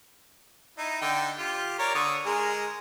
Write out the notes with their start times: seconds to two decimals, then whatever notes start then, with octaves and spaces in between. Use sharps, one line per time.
0.78 D#4 E4
1.02 D3 D#4 G5
1.38 F4 G4
1.79 A#4 C#5 D5
1.95 D3 C#6 D#6
2.26 G#3 G#4 A#4